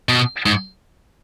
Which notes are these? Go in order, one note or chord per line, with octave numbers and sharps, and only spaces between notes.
B2
G#2